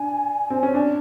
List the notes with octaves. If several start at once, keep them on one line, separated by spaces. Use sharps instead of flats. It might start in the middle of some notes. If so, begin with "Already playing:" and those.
Already playing: D4 G#5
C4
C#4
D4 A5